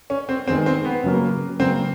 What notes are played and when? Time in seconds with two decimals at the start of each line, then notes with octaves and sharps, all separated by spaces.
0.10 C#4
0.29 C4
0.47 D#3 G#3 B3 C4
0.66 C4
0.85 B3
1.03 C#3 F#3 A#3
1.59 C#3 F#3 A#3 C4